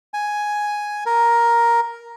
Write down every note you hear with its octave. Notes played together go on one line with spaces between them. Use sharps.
G#5
A#4